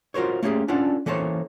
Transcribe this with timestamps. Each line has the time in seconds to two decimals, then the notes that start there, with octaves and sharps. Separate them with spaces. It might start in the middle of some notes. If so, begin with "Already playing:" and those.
0.14 F4 F#4 A#4 C5 C#5
0.43 A3 A#3 C#4 G4 G#4
0.68 C#4 D4 F4 A4 D5 F#5
1.06 E3 A#3 A4 C5 C#5